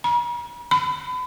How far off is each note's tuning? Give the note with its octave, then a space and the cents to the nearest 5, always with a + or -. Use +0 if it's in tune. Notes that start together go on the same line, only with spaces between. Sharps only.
B5 -45
B5 +30